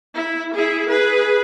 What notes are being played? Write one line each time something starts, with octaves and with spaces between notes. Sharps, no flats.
E4
E4 G#4
G#4 B4